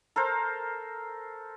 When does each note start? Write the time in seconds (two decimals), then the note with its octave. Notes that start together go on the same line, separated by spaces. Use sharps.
0.16 A4 A#4 C5